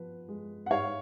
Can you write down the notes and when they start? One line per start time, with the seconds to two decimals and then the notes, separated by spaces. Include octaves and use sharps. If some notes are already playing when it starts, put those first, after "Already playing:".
Already playing: F3 B3 B4
0.29 G#3
0.66 F#5
0.71 G#2 C#5 F5